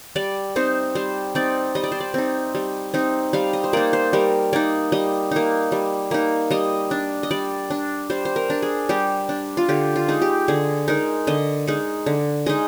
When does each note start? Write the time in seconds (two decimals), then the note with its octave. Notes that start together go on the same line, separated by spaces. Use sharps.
0.16 G3 D5
0.56 C4 D#4 C5
0.95 G3 C5
1.35 C4 D#4 D5
1.75 G3 D#5
1.84 D5
1.92 C5
2.00 D5
2.14 C4 D#4
2.55 G3
2.94 C4 D#4
3.33 G3 F5
3.53 D#5
3.64 C5
3.73 A#3 D#4 D5
3.93 C5
4.13 G3 A#4
4.53 A#3 D#4 D5
4.92 G3 D#5
5.31 A#3 D#4
5.72 G3
6.11 A#3 D#4
6.51 G3 D#5
6.91 D4
7.23 D#5
7.31 G3 D5
7.70 D4
8.10 G3 C5
8.25 C5
8.36 A#4
8.50 D4
8.62 G#4
8.89 G3 G4
9.29 D4
9.57 F4
9.69 D3 G4
9.96 F4
10.08 G#3 D#4
10.22 G4
10.48 D3 G#4
10.88 G#3 D#4 A#4
11.27 D3 D#5
11.67 G#3 D#4
12.06 D3
12.46 G#3 D#4 D#5